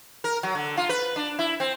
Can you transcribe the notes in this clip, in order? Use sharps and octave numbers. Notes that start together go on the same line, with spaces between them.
A#4
F#3
D3
F4
B4
D4
E4
C4